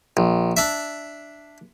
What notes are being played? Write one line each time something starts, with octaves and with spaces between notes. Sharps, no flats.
A#1
D4 E5